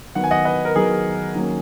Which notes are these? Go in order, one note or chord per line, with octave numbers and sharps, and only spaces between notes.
D#3 F#3 B3 F#5
G#5
D#5 F#5
B4 D#5
A#4
D#3 F#3 B3 G#4
D#3 F#3 A#3 C#4